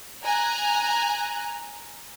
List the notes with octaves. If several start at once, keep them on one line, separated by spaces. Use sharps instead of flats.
G#5 A#5 F#6